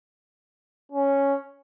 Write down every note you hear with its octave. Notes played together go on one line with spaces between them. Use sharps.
C#4